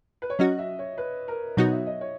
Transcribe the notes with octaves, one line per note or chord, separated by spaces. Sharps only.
B4
C#5
F#3 C#4 F#4 D#5
E5
C#5
B4
A#4
B2 F#3 B3 D#4 F#4 C#5
E5
D#5
C#5